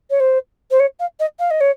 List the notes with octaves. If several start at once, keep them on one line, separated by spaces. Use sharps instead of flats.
C#5
C5
C5
C#5
F5
D#5
F5
D#5
C#5